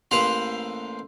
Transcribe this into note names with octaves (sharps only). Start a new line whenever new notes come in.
A1 A#3 B4 C5 F5 A#5